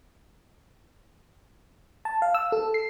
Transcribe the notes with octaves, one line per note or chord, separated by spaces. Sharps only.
A5
F5
E6
A4
C7